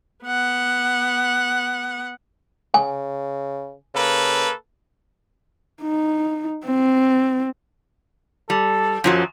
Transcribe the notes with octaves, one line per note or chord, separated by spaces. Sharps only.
B3 F#5
C#3 G#5
C#3 A#3 A4 B4
D#4
C4
G3 A4
F#2 F3 F#3